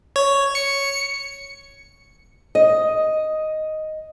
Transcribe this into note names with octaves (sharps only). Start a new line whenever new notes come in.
C#5
C#7
D#5